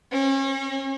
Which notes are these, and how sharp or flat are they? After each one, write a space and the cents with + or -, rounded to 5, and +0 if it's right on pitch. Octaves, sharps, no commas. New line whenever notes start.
C#4 -35